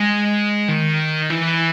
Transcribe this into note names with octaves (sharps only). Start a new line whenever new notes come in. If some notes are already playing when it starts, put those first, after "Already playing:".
Already playing: G#3
D#3
E3